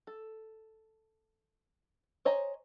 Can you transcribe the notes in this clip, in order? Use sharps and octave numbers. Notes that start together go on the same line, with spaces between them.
A4
C5 C#5 D#5 G#5 A#5